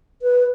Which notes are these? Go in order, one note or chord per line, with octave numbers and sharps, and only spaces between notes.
B4